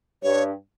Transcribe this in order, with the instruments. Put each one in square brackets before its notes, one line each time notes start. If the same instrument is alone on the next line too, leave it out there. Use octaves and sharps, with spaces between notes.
[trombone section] G2 [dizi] C#5